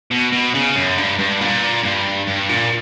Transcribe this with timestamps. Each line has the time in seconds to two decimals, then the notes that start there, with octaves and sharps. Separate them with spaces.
0.11 B2
0.32 B2
0.54 C#3
0.76 F#2
0.98 G2
1.19 G2
1.41 A#2
1.84 G2
2.28 G2
2.49 A#2